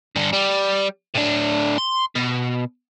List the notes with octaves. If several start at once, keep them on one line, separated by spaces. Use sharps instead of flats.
G2 D3
G3
A2 D4
C6
B2